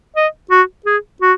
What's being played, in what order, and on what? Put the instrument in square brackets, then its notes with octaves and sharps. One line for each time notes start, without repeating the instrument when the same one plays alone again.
[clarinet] D#5
F#4
G#4
F#4